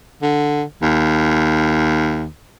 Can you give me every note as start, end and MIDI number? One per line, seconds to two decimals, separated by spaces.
0.22 0.63 50
0.82 2.26 39